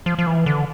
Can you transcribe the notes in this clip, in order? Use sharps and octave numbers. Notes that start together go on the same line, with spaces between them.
F3
F3
E3
D3